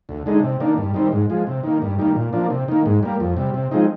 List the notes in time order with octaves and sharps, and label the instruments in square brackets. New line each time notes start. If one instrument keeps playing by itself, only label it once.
[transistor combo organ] D2
D3 G#3 D#4
C3
D#3 A#3 D4
G2
D#3 G3 C4
G#2
F3 G#3
C3
D#3 A#3
G2
D#3 G3 A#3
A#2
F3 A#3 D4
C3
D#3 A#3
G#2
G3 A#3
F2
C3 G3
C3
F3 G#3 C4 D#4